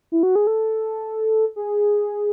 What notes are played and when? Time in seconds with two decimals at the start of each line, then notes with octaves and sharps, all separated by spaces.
0.12 E4
0.23 F#4
0.35 G#4
0.47 A4
1.56 G#4